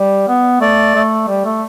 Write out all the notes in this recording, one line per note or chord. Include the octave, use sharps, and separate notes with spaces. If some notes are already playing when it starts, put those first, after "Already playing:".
Already playing: G3
B3
A3 D5
A3
G3
A3